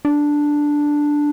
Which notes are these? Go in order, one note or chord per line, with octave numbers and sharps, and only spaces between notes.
D4